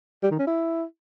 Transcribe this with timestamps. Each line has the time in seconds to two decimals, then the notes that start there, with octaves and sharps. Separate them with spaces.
0.23 G3
0.31 D#3
0.39 C#4
0.47 E4